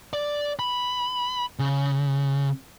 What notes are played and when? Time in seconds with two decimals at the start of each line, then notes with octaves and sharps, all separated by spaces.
0.13 D5
0.59 B5
1.59 C#3